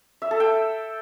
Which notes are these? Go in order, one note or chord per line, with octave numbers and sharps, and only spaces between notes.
E5
A4
G5